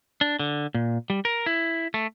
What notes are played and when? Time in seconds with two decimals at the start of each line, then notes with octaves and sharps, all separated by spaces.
0.21 D4
0.39 D3
0.74 A#2
1.10 G3
1.25 A#4
1.46 E4
1.94 A3